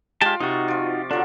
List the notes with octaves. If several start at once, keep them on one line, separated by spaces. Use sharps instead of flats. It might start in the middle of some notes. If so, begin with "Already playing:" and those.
G#3 F4 G4 D5 A5
C3 D#4 F#4 C#6
F3 D5
D3 F3 F#3 D4